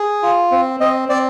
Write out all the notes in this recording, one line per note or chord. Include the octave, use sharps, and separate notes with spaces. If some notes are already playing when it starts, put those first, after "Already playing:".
Already playing: G#4
F4
C4
C4 D#5
C4 D5